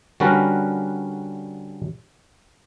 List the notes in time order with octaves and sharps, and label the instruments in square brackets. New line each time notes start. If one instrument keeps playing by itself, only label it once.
[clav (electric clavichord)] D3 G3 C#4 F#4 A#4 B4